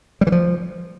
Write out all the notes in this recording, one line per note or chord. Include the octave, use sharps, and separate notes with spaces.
G3
E3
F3